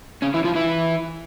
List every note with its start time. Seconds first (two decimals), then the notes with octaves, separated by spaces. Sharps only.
0.22 C#3 C#4
0.34 E3 E4
0.44 F3 F4
0.55 E3 E4